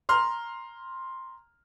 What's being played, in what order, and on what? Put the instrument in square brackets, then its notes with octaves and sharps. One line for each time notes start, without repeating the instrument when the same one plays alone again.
[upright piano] A#5 C6 F6